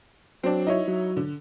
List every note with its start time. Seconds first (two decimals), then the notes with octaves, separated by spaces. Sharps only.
0.44 F#3 C4 D4
0.67 D#4 E4 C#5
0.88 F#3
1.17 D3